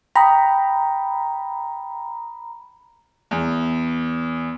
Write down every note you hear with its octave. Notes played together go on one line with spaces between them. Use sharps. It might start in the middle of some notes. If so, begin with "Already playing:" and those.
G5 A#5 B5 D#6
E2